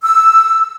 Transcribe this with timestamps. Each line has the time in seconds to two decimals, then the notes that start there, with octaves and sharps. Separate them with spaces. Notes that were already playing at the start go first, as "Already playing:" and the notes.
0.03 E6